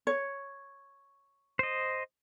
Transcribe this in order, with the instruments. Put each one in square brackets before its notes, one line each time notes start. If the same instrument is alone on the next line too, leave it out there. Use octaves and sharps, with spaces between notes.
[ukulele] C#5
[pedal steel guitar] C5 D#5